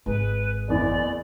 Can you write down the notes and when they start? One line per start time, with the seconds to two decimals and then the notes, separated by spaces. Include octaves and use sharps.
0.06 G#1 G#3 B4
0.68 F#1 E2 E3 D5